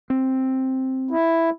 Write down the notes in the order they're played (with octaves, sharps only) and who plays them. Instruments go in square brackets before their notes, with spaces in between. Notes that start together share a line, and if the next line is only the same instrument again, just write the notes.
[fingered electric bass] C4
[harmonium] E4